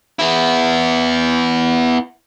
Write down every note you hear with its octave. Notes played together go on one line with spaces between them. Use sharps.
B3 E4